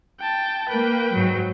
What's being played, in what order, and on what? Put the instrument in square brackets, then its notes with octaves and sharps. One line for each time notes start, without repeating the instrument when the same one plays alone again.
[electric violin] G5 A5
[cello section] A#3 [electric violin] B4 G5
[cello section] G#2 F#3